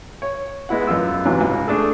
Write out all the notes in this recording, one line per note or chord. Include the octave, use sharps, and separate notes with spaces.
C#5
G#3 B3 E4 F#5
F#2 B3 F4 E6
G#2 C3 E3 F#3
C#2
A3 D4 G#4 A4